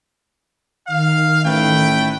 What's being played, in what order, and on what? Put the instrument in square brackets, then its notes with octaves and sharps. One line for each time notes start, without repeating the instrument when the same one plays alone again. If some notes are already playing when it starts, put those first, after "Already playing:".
[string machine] D#3 [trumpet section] F5
[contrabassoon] A1 [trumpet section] A3 B4 G5